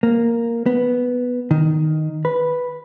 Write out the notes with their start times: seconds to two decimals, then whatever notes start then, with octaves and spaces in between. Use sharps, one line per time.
0.03 A#3
0.66 B3
1.51 D#3
2.25 B4